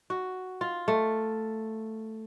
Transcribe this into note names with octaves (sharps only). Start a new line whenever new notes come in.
F#4
F4
A3